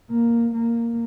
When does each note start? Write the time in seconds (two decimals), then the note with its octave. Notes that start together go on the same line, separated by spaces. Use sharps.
0.10 A#3
0.54 A#3